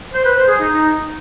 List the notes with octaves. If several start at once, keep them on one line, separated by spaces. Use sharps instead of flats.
C5
B4
C5
G#4
D#4